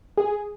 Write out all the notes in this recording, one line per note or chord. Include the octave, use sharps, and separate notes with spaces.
G#4